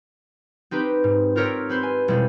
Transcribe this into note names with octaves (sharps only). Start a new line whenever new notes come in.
C4 D#4 G4 B4
G#2
F4 G4 A#4 C#5 E5
C4 B4 C5
G#5
E1 G3 G#3